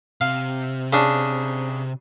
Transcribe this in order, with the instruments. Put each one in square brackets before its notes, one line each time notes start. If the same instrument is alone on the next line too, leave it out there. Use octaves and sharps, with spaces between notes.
[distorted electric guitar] C3 [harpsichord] F5
[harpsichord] C#3 D4